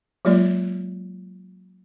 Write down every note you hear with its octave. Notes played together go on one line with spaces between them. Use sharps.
F#3 G#3 A#3 F4 D5